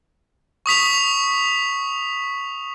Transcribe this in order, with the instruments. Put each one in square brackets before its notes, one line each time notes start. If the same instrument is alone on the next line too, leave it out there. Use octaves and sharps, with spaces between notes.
[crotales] C#6 D#6 B6 F7